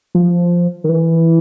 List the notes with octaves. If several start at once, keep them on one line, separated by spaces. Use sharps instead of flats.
F3
D#3
E3